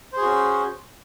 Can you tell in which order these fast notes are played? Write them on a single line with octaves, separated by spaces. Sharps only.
C5 G#4 F#4 C#4